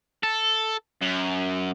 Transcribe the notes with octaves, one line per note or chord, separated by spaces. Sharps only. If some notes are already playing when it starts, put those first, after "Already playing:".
A4
F#2